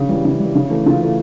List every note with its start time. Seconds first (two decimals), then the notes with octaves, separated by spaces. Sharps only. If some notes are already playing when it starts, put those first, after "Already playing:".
Already playing: C#3
0.09 E3 G3
0.24 C#3 E4
0.40 E3 G3
0.55 C#3
0.70 E3 A3
0.86 C#3 F4
1.01 E3 A3